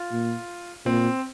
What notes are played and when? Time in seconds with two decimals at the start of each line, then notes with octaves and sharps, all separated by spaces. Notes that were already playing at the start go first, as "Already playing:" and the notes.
Already playing: F4
0.12 A#2
0.85 A#2 C4